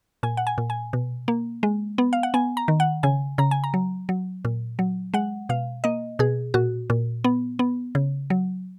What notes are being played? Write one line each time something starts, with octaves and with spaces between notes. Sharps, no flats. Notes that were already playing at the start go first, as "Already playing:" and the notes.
A#2 G#5
F#5
G#5
A#2
G#5
B2
A#3
G#3
B3
F5
F#5
B3 G#5
A#5
D#3
F#5
C#3 G#5
C#3 A#5
G#5
A#5
F#3
F#3
A#2
F#3
G#3 F#5
B2 F5
A#3 D#5
B2 G#4
A#2 F#4
A#2
B3
B3
C#3
F#3